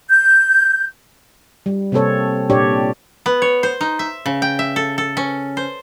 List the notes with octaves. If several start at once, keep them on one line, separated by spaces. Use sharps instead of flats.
G6
G3
C3 A#3 C4 A4 C#5
A#2 D4 G4 C#5 D5
B3
C#5
C5
D#4
E5
C#3
G5
E5
A4
A4
C#4
C5